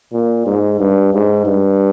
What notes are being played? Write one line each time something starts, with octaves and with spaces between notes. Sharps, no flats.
A#2
G#2
G2
G#2
G2